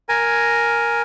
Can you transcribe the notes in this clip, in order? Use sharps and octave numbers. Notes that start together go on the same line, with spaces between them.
A#4 G#5